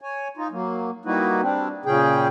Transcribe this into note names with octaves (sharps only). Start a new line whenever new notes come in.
C#5 G#5
D#4 F4
F#3 A#3
G3 A#3 D#4 E4 F#4 B4
G3 C4 D4
A#2 C#3 C#4 G#4 G5